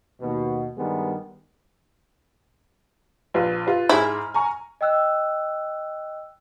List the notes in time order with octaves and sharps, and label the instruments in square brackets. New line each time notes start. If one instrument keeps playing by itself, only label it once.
[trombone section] D#2 B2
G2 D#3 G3 G#3 B3
[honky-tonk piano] A#1 F4 B4
F4 B4
[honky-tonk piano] G#2 G#4 F6 [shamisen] E4
[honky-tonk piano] G#5 A#5 C#6
[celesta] D#5 G5 E6 F#6